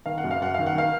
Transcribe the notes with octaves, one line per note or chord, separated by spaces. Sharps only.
D#3 F5
F#5
F#2
F5
F#2 F#5
D#3 F5
F#5
D#3 F5